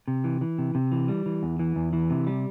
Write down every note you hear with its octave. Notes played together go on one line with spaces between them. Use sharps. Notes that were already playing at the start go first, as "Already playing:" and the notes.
C3
E3
E3
C3
C3
E3
G3
E3
E2
E3
E2
E3
C3
G3